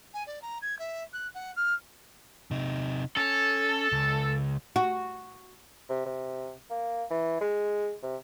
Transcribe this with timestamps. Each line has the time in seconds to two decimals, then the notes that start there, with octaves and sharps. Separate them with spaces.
0.13 G#5
0.26 D5
0.41 A#5
0.62 G#6
0.78 E5
1.13 F#6
1.34 F#5
1.56 F6
2.51 C3 D#4
3.17 C#4 A4
3.92 C#2
4.76 F#4
5.89 C3
6.06 C3
6.70 A#3
7.10 E3
7.41 G#3
8.03 C3